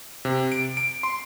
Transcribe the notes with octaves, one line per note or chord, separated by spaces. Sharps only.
C3
D7
D7
C6